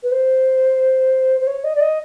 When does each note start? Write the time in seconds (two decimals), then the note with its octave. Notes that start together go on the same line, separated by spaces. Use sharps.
0.03 B4
0.11 C5
1.40 C5
1.47 C#5
1.64 D#5
1.75 D5
1.80 D#5